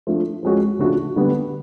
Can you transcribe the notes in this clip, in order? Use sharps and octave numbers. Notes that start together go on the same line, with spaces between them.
F3 A3 D4
F3 G#3 C#4 F#4
C#3 F3 A3 D4 F#4
D3 G3 B3 D4